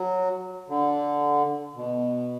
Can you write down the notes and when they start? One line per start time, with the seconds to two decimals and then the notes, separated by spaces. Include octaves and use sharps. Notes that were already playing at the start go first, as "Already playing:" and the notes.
Already playing: F#3
0.68 D3
1.75 B2